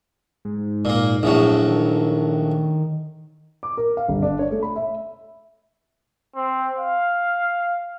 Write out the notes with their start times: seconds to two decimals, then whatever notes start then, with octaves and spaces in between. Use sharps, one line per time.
0.45 G#2
0.85 A#2 A#3
1.23 A#1 A2 F#3
1.67 D#3
3.63 D6
3.77 A#4
3.97 F5
4.08 G1
4.22 D4
4.39 C#5
4.51 A3
4.62 B5
4.76 E5
6.36 C4
6.79 F5